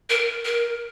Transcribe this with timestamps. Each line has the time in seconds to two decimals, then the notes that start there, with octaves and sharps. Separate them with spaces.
0.10 A#4
0.45 A#4